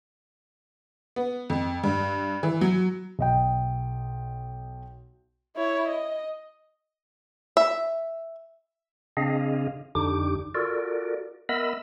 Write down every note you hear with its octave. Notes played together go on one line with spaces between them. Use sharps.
B3
F2
G2
E3
F#3
B1 D#5 G5
E4 C#5
D#5
E5
C#3 C4 D4 G#4 D#5 F5
F2 D3 D4 D#4 G4 D6
F4 F#4 A4 A#4 D5
B3 A#4 D#5 E5 B5 E6